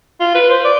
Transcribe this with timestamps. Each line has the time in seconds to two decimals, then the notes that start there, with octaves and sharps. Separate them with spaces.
0.20 F4
0.35 B4
0.50 C5
0.64 D5